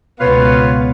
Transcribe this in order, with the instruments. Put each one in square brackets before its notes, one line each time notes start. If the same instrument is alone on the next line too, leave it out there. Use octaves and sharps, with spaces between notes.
[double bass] C#2 B2 [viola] B3 [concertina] F4 C#5 [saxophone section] B4 F5